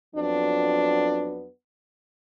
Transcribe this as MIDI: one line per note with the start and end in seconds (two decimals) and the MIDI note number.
0.16 1.47 41
0.16 1.47 54
0.16 1.47 59
0.16 1.47 62